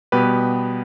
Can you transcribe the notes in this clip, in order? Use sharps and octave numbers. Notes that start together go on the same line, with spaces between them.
B2 G3 B3 G4 B4